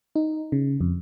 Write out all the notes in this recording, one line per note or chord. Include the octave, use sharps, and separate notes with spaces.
D#4
C#3
F2